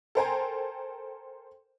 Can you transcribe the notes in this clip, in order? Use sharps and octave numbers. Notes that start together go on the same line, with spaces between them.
A4 A#4 C5 G5 G#5 A#5